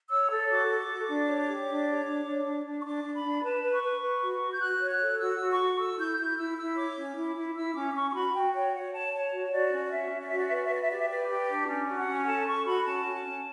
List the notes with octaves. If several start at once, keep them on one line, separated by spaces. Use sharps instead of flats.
C#5 E6
A4
F#4 D6
A4
F#4
D4
C#5
G4
D4
C#5
D4
D4
D4
D4
C#6
D4 D6
D4
B5
D4
B4 A5
B4
C#6
B4
B4
F#4
F#4
G6
F#4 F#6
C#5
F#6
A4
F#4 E6
F#4
C#6
F#4
A4 E6
E4 G6
E4 G6
E4 E6
E4 E6
C#5 D6
C#4
E4
E4
E4 E6
C#4 D6
D6
C#4 C#6
C#6
F#4 B5
F#4 G5
C#5 G5
C#5 F#5
C#5 A5
C#5 A5
F#4
F#4 D5
C#4 D5
D5
C#4 E5
C#4
D5
F#4 E5
D5
B4 E5
D5
E5
B4 D5
E5
G4 D5
E5
B4 D5
G4
D4
C#4 D5
F#4
F#5
C#4
A4 A5
A4 C#6
F#4 B5
C#4 A5
C#4
C#4